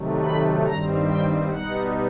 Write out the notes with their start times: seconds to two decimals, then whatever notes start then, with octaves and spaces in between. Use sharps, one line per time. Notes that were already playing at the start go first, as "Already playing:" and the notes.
Already playing: C3 D#3 F#3 A3
0.24 B5
0.67 G2 D#3 G3 C4 A#5
1.08 G5
1.50 B2 G3 B3 D#4 F#5